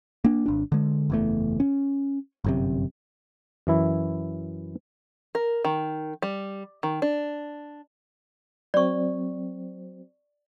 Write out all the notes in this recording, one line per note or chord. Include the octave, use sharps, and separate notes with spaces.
A#3 D4
G#1 D4
D3 G#3
F#1 E2 A3
C#4
G1 F#2 C3
F#2 E3 E4
A#4
D#3
G3
D#3
D4
F#3 C4 D5 C#6